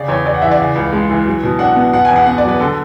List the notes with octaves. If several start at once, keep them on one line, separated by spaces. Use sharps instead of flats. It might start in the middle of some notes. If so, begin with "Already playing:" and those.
Already playing: C#3 D5
E2 C#5
E2 D5
F#5
E3 E5
D5
C#3
C#2
G#3
E3
F#3
B2
D4 F#5
B3
B2 F#5
G#5
E2
F#5
B3 F#5
D5
F#3 B4
D3 A4